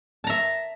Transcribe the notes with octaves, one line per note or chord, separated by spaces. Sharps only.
E5 A5 A#5